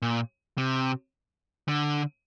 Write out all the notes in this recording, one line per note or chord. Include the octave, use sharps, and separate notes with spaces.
A#2
C3
D3